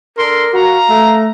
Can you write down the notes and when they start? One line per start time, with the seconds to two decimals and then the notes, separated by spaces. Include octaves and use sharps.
0.18 D4 A4 A#4 C6
0.53 F#4 F5 A#5
0.89 A3